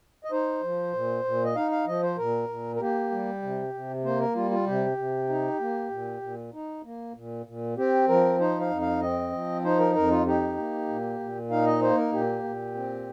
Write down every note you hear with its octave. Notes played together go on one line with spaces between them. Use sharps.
D#5
D#4 C5
F3
A#2
A#2
D#5
D#4 F5
F5
F3 D#5
C5
A#2 A#4
A#2
A#4
A#3 G4
G3
C3
C3
A#3 C5
A#4
G3 F4
F4
C3 G4
C3
D#4
A#3
A#2
A#2
D#4
A#3
A#2
A#2
C4 G4
F3 A#4
D#4 C5
F5
F2
F5
C4 D#5
F3
D#4 C5
A#4
F2 A#4
F4
D#4 G4
A#3
A#2
A#2
D#4 F5
D#5
A#3 C5
A#4
A#2 G4
A#2
C4